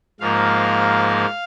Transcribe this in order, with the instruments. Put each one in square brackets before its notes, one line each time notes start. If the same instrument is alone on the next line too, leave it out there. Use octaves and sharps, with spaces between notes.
[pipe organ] G#2 F3 A#3 F5